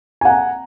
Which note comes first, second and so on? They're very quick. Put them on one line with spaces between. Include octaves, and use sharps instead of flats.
G#5 F#5 A#5